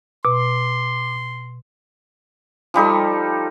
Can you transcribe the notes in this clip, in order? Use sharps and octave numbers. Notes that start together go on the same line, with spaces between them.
B2 C6 D6
F3 G3 D#4 A4